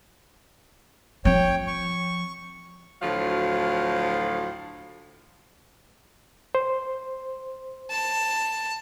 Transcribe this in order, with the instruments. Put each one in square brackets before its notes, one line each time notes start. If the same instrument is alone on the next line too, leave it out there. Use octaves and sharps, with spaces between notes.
[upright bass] F3 C4 [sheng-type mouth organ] C#5 G5
[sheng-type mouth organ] C#6
[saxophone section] D2 A2 F3 F#3 F5
[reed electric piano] C5
[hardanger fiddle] A5